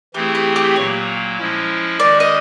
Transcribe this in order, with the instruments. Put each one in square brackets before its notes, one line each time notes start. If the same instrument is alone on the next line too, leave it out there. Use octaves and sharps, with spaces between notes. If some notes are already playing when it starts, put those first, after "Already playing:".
[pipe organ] E3 A3 C4 E4 G#4 [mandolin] G4
[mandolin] G4
G4
[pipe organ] A#2 F#3 A#3 [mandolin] C#5
[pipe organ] F3 G#3 C#4 E4
[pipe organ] D#3 G#3 C#4 F#4 [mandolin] D5
[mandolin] D#5